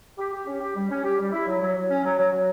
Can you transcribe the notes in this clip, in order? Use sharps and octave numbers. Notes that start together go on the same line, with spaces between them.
G4
G4
C#4
G4
G3
C#4
G4
G3
E4
F#3
F#3
F#3
C#4
F#3
F#3
F#3